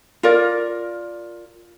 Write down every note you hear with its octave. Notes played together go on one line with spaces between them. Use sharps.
F4 A#4 D5